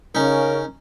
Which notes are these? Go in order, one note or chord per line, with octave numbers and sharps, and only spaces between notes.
C#3 C#4 D#4 A#4